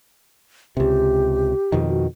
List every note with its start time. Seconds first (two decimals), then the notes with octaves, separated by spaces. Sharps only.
0.77 C#2 C3 G4
1.72 F2 B2 D#3
1.89 F#4